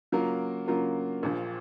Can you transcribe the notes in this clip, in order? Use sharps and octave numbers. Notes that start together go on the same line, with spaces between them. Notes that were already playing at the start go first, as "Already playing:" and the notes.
C#3 F#3 A#3 F4 A#4
C#3 F#3 A#3 F4 A#4
A#1 A#2 F3